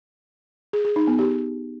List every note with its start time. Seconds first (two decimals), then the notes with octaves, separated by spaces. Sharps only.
0.73 G#4
0.85 G#4
0.96 D#4
1.07 B3
1.19 G4